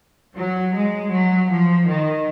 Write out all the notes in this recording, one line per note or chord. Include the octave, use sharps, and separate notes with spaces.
F#3
G#3
F#3
F3
D#3